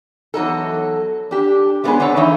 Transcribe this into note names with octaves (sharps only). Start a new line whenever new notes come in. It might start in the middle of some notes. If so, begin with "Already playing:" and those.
E2 F#3 D#4 A4
D4 G4
G#3 A3 B3 C#4 D4 G#4
D3 C4 A4 C#5
F2 E3 D#4 E5